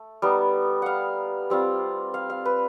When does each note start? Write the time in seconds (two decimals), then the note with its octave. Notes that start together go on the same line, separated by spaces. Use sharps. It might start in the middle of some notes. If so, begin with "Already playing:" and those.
Already playing: A3
0.22 G3 B3 D#4
0.82 F5 F#5
1.50 G3 C4 F4
2.14 F5
2.30 F5
2.45 B4